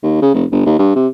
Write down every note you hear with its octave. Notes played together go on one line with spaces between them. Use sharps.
D#2
C#3
F1
G1
D#2
G2
C3